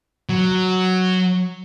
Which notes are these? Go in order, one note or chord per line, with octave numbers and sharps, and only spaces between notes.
F#3